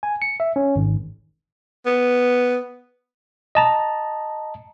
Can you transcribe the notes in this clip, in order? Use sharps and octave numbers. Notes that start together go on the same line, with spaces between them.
G#5
C#7
E5
C#4
G#1
B3
D#5 A5 A#5